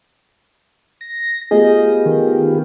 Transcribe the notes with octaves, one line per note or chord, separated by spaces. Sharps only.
A#6
A3 B3 F4 G4 G#4 D#5
D#3